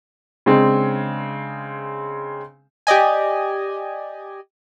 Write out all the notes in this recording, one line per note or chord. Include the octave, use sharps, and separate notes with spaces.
C#3 G#3 C4 D4
G4 D5 D#5 G#5